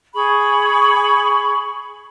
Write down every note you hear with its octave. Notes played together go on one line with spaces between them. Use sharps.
G#4 B5 C#6